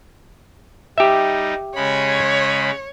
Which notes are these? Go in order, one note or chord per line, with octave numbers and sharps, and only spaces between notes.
G3 D#4 G4 E5
C#3 G#3 C#5 B5